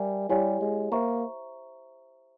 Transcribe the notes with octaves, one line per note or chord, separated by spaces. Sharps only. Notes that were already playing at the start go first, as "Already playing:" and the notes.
Already playing: G3 G4 A#4 E5 G#5
G3 E4 G4 C#5 F5 G#5
G#3
A#3 C5 E5 A#5 C#6